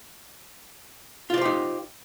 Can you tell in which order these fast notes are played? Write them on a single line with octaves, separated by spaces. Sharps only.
F4 D5 C5 G4 D#4